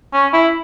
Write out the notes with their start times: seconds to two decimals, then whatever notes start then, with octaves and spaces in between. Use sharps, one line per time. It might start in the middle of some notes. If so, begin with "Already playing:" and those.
0.13 C#4
0.33 E4